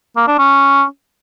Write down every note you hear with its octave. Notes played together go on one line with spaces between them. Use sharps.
A#3
D4
C#4